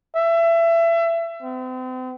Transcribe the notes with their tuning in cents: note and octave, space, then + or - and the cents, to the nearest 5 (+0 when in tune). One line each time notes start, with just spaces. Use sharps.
E5 +25
C4 -40